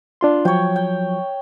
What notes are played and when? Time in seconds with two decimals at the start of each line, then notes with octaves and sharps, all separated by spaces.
0.21 D4 F4 C6
0.45 F3 F#3 C#5 G5
0.76 G5